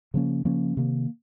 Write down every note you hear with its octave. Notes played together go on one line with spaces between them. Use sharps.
C#3 F3 A#3 C#4
C#3 F3 A#3 C#4
C3 D#3 A#3